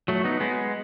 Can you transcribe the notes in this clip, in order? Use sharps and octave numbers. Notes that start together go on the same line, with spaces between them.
F#3 A3
B3 D#4
G#3 B3